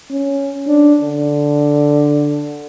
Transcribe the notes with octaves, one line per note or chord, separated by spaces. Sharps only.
C#4
D4
D3